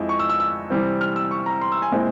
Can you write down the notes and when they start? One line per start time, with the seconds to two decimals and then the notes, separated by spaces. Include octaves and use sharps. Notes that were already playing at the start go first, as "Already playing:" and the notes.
Already playing: F2 G#3 E4
0.09 C#6
0.19 E6
0.29 E6
0.40 E6
0.70 C3 E3 G3 C4
1.01 F6
1.16 E6
1.31 C#6
1.46 A#5
1.61 C6
1.72 E6
1.82 G#5
1.92 A#2 G#3 C4 E4